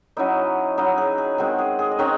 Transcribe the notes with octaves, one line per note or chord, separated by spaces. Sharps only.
F#3 C#4 D#4 E4 D#5
F#3 C#4 D#4 E4 D#5
G#4
G#4
D#3 G#3 C4 F#4
G#4
G#4
D#5
D#3 G#3 C4 C#4 C#5